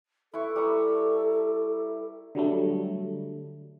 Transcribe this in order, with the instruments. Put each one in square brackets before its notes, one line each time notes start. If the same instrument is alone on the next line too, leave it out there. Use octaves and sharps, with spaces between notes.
[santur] E4 B4 C#6 [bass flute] A4
[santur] G3 A#5 C#6
[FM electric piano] D3 F#3 G3 A3